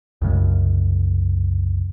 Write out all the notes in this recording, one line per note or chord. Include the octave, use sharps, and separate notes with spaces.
C2 F#2 C#3 G#3